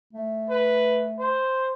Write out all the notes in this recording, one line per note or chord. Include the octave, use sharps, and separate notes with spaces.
A3
B4
C5